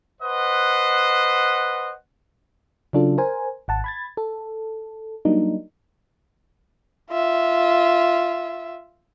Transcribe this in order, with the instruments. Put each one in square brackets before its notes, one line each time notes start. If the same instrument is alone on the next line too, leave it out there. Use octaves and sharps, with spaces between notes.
[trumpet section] B4 C5 D#5 F#5
[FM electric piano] C#3 F#3 D4 F4 A4
A#4 C5 G#5
G#1 F#5 A5
B5 G#6 A6
A4
F#3 G3 A#3 D4 D#4
[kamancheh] F4 E5